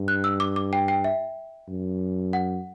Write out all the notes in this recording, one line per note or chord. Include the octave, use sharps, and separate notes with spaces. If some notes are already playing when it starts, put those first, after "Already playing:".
Already playing: G2
F#6
E6
D6
D6
G5
G5
E5
F#2
F#5